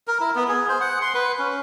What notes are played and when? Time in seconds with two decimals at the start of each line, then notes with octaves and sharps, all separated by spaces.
0.07 A#4
0.20 E4
0.35 B3
0.48 G#4
0.69 C5
0.81 F#5
1.02 C6
1.14 B4
1.39 C#4